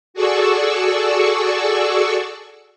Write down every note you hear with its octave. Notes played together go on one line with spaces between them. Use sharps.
F#4 G#4 A4 D5 C#6 E6